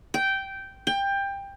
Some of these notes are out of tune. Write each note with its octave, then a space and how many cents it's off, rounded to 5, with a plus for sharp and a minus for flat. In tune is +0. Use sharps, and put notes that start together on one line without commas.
G5 -10
G5 +20